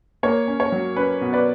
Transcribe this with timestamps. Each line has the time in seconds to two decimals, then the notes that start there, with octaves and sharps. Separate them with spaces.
0.23 A#3 C#5
0.48 C#4
0.60 C#5
0.72 F#3
0.96 C#4 B4
1.21 B2
1.33 B4 D5